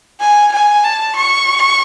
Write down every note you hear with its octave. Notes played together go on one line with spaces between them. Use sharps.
G#5
G#5
A5
C#6